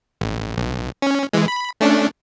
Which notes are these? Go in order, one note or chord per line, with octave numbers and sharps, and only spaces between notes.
A1
B1
C#4
E3 G#3
B5
A3 C#4 D4